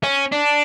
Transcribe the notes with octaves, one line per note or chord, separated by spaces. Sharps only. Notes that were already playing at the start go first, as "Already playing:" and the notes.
C#4
D4